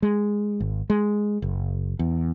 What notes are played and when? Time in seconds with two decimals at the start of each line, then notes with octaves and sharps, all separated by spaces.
0.02 G#3
0.60 G#1
0.90 G#3
1.42 F#1
1.99 E2